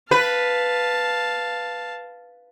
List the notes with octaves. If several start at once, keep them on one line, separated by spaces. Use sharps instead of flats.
B4 F5 A5